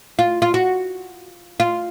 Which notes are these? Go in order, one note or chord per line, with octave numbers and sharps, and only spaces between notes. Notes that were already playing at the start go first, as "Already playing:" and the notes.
F4
F4
F#4
F4